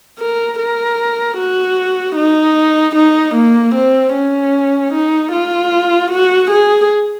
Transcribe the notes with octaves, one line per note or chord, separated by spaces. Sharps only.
A#4
A#4
F#4
D#4
D#4
A#3
C4
C#4
D#4
F4
F#4
G#4